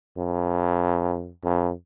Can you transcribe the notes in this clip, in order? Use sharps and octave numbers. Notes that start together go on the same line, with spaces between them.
F2
F2